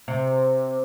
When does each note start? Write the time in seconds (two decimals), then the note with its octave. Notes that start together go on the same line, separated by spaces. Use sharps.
0.08 C3